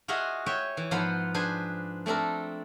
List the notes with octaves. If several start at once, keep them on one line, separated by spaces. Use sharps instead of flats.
F4 F#4 G#4 D#5 E5 F#5
C#5 E5 G5 G#5
E3
G#2 F3 B3 C5 F#5 B5
D4 G#4 B4 C5 G#5
A3 C4 D4 A4 A#4